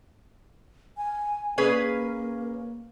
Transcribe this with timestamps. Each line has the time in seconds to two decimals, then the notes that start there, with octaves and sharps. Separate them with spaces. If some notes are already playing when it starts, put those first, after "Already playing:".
0.97 G#5
1.58 A#3 C#4 G#4 B4